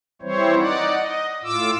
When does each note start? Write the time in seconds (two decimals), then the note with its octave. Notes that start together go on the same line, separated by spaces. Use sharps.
0.22 E3 G3 C4 E4 C5 C#5
0.57 D#4 D5 F#5
0.97 D#5
1.43 A2 F4 D6 E6